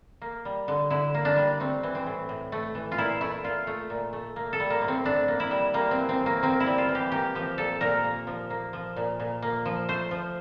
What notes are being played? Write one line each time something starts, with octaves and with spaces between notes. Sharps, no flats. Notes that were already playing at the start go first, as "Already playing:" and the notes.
A#3
G3
D3
D3 E4
A#3
D4
G3
A3 C4
E3
C4
A2
A2
A3
E3
F4
A#2 E4
A3 E4
A#2 F4
A3
A#2
A3
A#3
A4
G3
A#3
A2
C4
A2 D4
A#3
E4
G3
G3 A#3
C4
E3
C4
A2
A#3
A#3 C4
E4
G3
F4
E3
G4
A#3 G4
F3 G4
A#2 A4
A#2 A#4
A#3
F3
A#3
F3
A#2
A#2
A#3
F3
A3 C5
F3